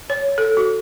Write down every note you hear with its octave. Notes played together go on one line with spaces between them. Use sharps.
C#5
A4
F#4